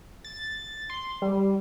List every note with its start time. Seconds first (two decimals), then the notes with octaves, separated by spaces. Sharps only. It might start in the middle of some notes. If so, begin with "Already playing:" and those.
0.24 A6
0.90 C6
1.22 G3